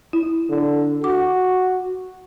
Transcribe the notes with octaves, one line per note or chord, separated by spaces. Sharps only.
E4
D3
F#4 D6